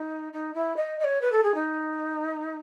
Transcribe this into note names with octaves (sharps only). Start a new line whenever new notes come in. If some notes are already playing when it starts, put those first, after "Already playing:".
Already playing: D#4
D#4
E4
D#5
D#5
C#5
B4
A4
G#4
D#4